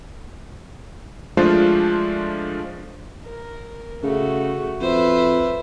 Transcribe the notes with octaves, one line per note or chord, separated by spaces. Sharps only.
F3 G#3 A3 D4 F4 C5
A#4
C#3 A3 F#4
F2 B4 C5 E5